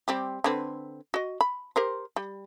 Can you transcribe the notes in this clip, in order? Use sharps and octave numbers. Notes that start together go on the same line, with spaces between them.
G3 C4 G4
D3 C4 B4
F#4 D#5
B5
G4 A#4 C5
G3